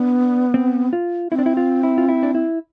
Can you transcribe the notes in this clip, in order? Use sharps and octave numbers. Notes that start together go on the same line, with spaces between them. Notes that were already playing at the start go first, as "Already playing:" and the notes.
Already playing: B3 D4
C4
F4
C4 E4
D4
E4
F4
E4
F4
E4
D4
E4